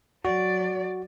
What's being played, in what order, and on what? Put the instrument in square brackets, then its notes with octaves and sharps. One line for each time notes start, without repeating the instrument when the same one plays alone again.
[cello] F#3 D5 [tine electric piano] F#4